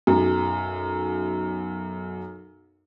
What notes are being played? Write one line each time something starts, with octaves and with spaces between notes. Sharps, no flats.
B1 F#2